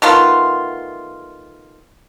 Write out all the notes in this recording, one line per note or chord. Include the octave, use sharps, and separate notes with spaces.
D#3 A3 B3 F4